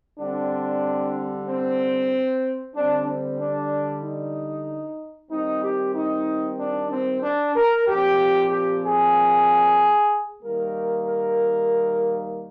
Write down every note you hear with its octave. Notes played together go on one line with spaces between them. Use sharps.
D3 G3 C4 D4
C4
D3 G3 C4 D4
C4
D4
D#4
D#3 G3 C4 D#4
G4
D#4
D4
C4
D4
A#4
A#2 F3 C4 G4
G4
G#4
D#3 G3 A#3 A#4
A#4